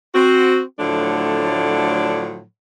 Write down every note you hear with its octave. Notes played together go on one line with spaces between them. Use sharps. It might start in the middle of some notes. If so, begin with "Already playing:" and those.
C4 F#4
A2 D3 F3 F#3 A3 D4